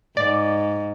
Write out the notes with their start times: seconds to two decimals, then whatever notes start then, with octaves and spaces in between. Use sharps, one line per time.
0.17 G#2 D5